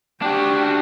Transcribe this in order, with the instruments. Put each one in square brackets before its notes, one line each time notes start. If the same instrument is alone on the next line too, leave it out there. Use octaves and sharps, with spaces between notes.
[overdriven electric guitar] D4 F#4 [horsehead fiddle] G4 G5